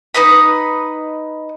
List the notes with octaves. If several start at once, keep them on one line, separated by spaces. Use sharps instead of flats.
D#4 B4 D#5 B5